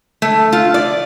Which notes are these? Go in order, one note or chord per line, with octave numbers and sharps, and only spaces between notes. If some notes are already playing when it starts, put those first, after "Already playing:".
A3
F4
D5